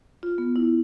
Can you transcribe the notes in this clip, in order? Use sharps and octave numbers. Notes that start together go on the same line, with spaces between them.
F4
B3
E4